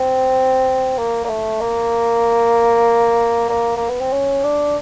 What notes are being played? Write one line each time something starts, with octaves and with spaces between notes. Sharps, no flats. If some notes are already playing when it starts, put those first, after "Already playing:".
Already playing: C4
A#3
A#3
A3
A#3
A#3
A#3
B3
C4
C#4
D4